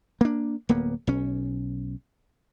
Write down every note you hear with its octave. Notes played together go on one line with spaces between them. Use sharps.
A#3 D4
D1 A#3 B3
B1 C#4